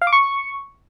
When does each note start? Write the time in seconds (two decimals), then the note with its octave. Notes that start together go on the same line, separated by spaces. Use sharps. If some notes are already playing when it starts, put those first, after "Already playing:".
0.02 F5
0.07 D6
0.13 C#6